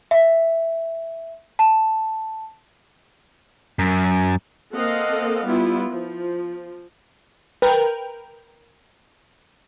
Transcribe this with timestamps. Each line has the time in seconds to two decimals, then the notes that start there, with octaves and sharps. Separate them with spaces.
0.11 E5
1.59 A5
3.79 F#2
4.76 A#3 C4 A4 D#5 F5 F#5
5.45 G3 B3 E4 F4
5.89 F3
7.62 A#4 B4 G5